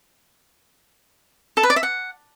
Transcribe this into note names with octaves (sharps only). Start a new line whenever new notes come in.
A4
B4
D5
E5
F#5